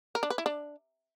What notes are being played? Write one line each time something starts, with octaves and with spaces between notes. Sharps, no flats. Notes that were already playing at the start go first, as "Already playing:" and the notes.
A#4
D4
B4
E4
D4